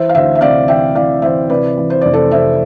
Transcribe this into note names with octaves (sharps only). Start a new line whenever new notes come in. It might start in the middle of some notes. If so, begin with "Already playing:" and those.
Already playing: E3 C5 E5
F5
D2 C5 E5
E5
C3 D5 F5
E3 E5 G5
E3 D5 F5
E3 C5 E5
C3 B4 D5
E3
C5
F1 D5
A4 C5
C3 C5 E5